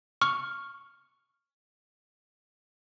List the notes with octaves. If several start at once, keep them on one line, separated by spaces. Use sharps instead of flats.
C#6 F6